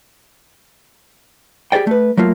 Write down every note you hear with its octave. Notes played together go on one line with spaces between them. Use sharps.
G4 G#4 C#5 D5 G5
A3 B4
F#3 A3 A#3 F4